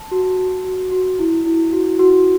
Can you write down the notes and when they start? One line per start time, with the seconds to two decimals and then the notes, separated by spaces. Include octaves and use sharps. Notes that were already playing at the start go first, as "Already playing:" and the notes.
Already playing: A5
0.11 F#4
0.38 F#4
0.65 F#4
0.92 F#4
1.19 E4
1.46 E4
1.73 F#4
1.99 F#4